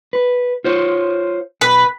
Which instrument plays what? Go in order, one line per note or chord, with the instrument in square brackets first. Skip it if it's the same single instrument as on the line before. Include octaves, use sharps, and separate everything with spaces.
[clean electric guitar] B4
F4 C5 C#5
[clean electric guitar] B1 [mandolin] B4